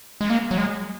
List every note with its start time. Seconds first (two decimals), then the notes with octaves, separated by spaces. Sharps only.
0.21 G#3
0.30 A#3
0.51 F#3
0.57 G#3